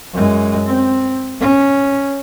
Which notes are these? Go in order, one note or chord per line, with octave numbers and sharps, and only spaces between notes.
F#2 G#3
C4
C#4